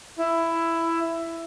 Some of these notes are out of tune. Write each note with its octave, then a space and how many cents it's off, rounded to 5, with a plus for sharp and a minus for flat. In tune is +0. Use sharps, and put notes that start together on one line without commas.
E4 +10